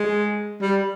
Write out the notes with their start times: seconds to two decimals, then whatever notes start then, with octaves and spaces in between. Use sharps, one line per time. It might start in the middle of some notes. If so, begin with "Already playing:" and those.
Already playing: G#3
0.61 G3